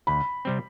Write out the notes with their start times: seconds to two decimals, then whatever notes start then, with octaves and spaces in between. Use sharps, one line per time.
0.07 D2 B5
0.45 C3 G3 C4